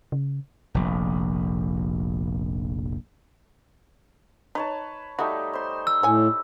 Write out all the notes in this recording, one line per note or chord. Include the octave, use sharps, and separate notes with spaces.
C#3
F1 A#1
D#4 B4 C#5 A5
G3 A3 D#4 F#4
C5 C6
E6
A2 C#5 G#5